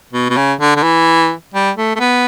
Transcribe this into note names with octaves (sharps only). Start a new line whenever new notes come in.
B2
B2
C#3
D3
D3
E3
G3
A3
A3
B3